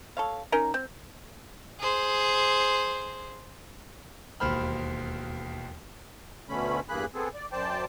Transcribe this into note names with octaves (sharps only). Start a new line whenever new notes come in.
A4 C#5 F5
C#4 D#4 A#4
C4
G#4 C5
E1 D#2 C5 B5 F6
D2 B2 D3 A3 C#4 B5
E2 G2 A#3 G#4 B5 F#6
B3 C4 G#4 A4
D5
F#2 C5 D5 G5 A5